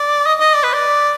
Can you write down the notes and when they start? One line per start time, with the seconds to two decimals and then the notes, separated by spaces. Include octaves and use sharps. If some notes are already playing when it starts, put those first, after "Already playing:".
Already playing: D5
0.26 D#5
0.40 D#5
0.55 D5
0.63 B4
0.74 D5